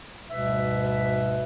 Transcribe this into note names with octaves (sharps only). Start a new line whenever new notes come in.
D2 G#2 B2 G3 B4 E5